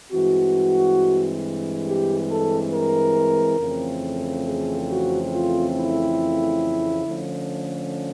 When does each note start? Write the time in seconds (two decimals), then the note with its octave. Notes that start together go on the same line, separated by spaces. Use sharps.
0.12 G2 E3 G#3 C4 F#4
1.85 G4
2.29 A4
2.72 A#4
3.58 F2 C#3 E3 A3 C4
4.45 G#4
4.88 F#4
5.33 F4
5.75 E4
7.06 D3 F3 A3 C#4